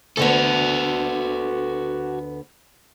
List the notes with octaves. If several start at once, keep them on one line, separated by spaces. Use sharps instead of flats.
D2 D3 B3 F#4 A4